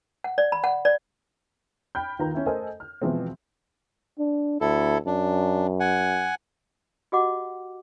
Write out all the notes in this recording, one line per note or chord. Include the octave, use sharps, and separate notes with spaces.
F#5
D5
B5
F#5
D5
G5 B5 F6 G6
D#2 D#3 F4 B4 A#5
C#4 E4
A3 A4 A#4 C5 D#5 G#5
F6
B2 E3 F3 G#3 C4
D4
D2 E4 A4
F#2 D4
F#5 G#5
F#4 G4 D#5 F#5 D6